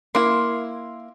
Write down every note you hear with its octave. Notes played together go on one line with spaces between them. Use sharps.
A#3 E4 C6